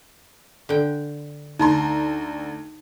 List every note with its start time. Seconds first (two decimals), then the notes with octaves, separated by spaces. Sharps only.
0.69 D3 G5
1.59 D2 D#4 A#5 C6